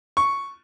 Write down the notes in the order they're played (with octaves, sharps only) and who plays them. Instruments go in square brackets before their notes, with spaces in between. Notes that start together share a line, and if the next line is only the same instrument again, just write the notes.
[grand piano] C#6